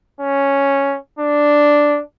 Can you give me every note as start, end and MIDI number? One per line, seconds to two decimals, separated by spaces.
0.20 0.98 61
1.19 2.01 62